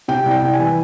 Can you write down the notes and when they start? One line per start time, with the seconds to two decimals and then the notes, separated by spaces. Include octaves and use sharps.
0.08 C3 G5
0.26 C2
0.31 G5
0.42 C2
0.53 G#5
0.59 E3